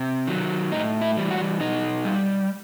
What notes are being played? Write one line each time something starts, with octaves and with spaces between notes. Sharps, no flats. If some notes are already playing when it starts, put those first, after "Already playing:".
Already playing: C3
D#3 F#3
A2 D#4
E4
E3 G3
F#4
B2 D#4
G3